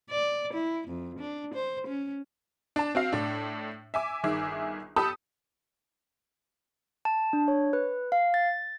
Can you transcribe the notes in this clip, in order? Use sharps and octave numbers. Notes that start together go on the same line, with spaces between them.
D5
E4
F2
D4
C5
C#4
D4 A5
C4 F#4 F5
A2 D4
E5 G#5 D6
G1 D#3 G#4 E5 D6
G4 A4 A5 B5 D#6
A5
D4
C#5
B4
F5
A6